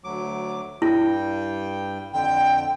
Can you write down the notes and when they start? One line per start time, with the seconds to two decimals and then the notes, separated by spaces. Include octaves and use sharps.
0.04 D2 F#3 D6
0.82 G2 G3 E4 G5
2.13 F2 D3 G5